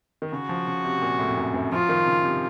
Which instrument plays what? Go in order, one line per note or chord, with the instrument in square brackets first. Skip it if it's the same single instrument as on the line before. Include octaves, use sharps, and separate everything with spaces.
[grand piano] D#3
[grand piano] C#3 [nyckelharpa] F#4
[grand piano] F3
C#3
C3
A#2
A2
F2
F#2
F#2
[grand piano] F3 [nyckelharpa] F4
[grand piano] D#3
C#3
C3